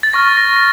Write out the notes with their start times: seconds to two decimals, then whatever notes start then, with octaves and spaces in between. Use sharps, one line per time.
0.03 A6
0.13 C#6 F6 A#6
0.37 A#6
0.56 A#6